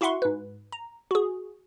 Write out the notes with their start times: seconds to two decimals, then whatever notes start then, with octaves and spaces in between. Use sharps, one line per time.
0.01 E4 F#4 E5 F#5 C6 C#6
0.22 G#2 B4
0.72 A#5
1.11 F#4 G#4